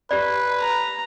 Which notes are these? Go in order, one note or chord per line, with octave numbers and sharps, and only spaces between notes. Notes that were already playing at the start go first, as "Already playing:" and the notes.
G4 B4 D5
A#5